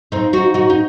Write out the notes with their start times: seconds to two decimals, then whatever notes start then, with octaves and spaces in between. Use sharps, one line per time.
0.12 C4 D#4
0.33 D#4 F#4
0.54 D#4 F#4
0.70 D#4